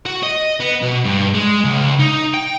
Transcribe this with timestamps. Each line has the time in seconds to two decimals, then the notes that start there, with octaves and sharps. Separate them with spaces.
0.06 F#4
0.23 D#5
0.60 B3
0.83 B2
1.05 G2
1.34 G#3
1.64 C#2
1.99 D#4
2.34 G5